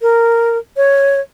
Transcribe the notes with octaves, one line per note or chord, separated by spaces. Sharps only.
A#4
C#5